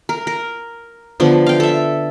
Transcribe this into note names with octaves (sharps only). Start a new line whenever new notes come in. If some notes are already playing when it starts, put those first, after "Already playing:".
A#4
A#4
D3 F3 B3
F5 G5
A4 E5